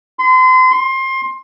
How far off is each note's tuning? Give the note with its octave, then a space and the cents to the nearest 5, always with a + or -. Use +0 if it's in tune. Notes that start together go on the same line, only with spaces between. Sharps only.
C6 -35
C6 +25